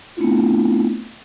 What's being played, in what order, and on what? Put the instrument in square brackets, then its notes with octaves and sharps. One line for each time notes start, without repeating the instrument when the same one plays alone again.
[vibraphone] A3 B3 C4 D4 E4 F4